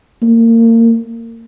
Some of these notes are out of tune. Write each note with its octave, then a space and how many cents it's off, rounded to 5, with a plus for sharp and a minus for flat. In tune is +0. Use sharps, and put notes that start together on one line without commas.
A#3 -30